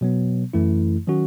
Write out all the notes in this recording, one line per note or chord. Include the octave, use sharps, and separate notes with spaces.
B2 F#3 B3
F#2 E3 A3 E4
D#3 F#3 C#4 F#4